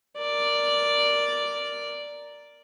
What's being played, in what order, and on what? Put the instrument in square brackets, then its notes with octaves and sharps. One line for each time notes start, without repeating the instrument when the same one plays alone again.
[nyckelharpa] A#4 D5